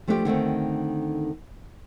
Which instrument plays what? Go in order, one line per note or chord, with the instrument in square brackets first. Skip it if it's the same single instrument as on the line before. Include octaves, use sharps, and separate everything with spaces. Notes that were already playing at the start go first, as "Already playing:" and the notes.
[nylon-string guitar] F3 A3 D4 E4 G4
D3 D#3 A3 C4